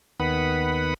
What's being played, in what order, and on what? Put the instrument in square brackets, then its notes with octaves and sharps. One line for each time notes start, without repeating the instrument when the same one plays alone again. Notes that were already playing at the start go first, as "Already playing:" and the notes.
[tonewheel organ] D#2 D#3 B3 B4 F#5 B5